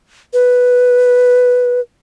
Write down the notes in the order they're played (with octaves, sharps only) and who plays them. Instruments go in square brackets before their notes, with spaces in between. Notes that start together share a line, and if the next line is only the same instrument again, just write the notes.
[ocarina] B4